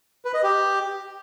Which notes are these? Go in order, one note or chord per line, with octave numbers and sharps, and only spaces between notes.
B4
D#5
G4